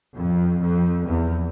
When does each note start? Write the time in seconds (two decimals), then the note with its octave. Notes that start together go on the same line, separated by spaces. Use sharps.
0.17 F2
0.61 F2
1.06 E2